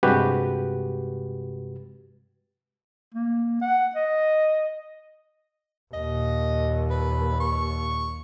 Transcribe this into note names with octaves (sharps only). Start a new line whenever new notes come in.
G2 C3 G#3 F#4 G4 B4
A#3
F#5
D#5
D#2 A#2 D#5
B4
C#6